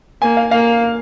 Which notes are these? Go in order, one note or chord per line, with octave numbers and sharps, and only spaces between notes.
A#3 G#5
F5
A#3 F5